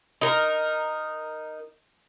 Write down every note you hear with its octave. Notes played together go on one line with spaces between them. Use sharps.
D#4 A#4